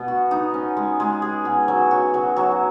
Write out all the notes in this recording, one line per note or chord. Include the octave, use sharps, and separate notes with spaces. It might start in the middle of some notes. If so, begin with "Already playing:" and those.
Already playing: B2 B3
F#4
D#4
C#4
G#3
G#3
G#4
B2
F#3
F#4
F#3
F#3